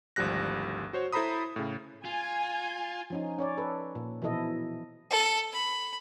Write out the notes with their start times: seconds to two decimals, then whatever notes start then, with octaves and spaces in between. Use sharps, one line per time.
0.16 G#1 D2 F3 G3 F#6 A#6
0.93 F#4 C5 C#5
1.13 E4 A4 C5 A#5 B5 D#6
1.56 A2 C#3
2.05 F4 G#5
3.10 F3 C#4 D#4
3.38 C#4 C#5 D5
3.58 A4 B4
3.95 A#2
4.22 B2 E3 F3 E4 A4 D#5
5.11 A4
5.52 B5